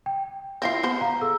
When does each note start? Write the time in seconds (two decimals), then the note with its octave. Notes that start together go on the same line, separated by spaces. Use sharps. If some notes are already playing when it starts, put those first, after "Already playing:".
0.06 G5
0.62 C4 E4 F4 A#6 C7
0.83 B3 C5
1.01 F5 A#5
1.21 G#4 A4 E6